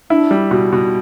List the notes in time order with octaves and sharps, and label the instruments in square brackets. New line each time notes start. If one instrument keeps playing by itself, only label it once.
[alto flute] D4 [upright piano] E4
[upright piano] G3
B2
B2